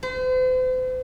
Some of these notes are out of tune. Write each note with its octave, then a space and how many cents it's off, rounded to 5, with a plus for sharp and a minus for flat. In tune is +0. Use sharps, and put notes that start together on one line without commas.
C5 -40